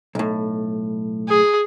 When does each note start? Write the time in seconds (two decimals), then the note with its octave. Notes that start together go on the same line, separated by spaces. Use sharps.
0.15 B1 A2
1.29 G#4